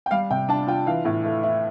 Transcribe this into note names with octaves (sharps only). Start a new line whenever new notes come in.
G5
G3 F5
C3 G5
D4 A5
F4 G5
E3 F5
A2
A3
E4